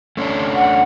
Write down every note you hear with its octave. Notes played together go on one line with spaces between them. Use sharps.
A3 C#4 D4
F#5